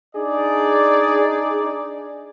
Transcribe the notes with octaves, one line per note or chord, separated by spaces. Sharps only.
D4 D#4 G#4 D5